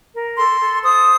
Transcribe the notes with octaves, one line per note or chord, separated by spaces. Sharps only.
A#4
A4 C6
A4
C5 D#6